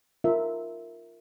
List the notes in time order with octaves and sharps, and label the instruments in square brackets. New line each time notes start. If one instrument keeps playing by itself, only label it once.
[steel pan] F4 A#4 E5